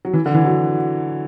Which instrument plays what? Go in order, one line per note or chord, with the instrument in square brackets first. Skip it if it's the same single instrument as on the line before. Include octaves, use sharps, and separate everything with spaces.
[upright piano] F#3
E3
D3
E3
F#3